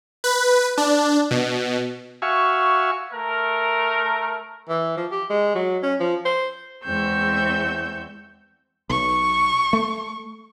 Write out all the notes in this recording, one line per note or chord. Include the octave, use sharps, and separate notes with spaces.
B4
D4
B2
F#4 E5 F5 G#5 C#6
A3 A#4
E3
F3
G4
G#3
F#3
C#4
F3
C5
E2 G#3 C4 C#6 E6 G6
B1 C#6
A3